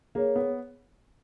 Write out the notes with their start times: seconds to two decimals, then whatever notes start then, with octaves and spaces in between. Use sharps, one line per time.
0.15 A#3 G#4 C#5
0.36 B3